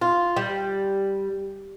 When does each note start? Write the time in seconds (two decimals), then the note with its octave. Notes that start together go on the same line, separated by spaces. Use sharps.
0.01 F4
0.37 G3